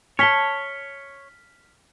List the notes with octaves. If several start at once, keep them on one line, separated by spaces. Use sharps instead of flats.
C#5 G#5 A5 F6 B6 G7